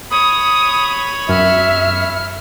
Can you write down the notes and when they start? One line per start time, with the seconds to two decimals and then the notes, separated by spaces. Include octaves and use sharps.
0.11 C#5 B5 D#6
1.29 F#2 E5 F6